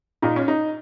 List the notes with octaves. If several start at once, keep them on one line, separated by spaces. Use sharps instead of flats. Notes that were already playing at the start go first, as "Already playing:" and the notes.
A#2 D#4
C#4
D#4